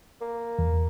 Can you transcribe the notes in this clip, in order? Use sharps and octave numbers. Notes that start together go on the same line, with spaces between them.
A#3
E2